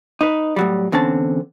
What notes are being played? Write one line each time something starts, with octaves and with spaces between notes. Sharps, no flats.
D#4 B4
A2 F#3 G3
E2 D3 C4 C#4 A5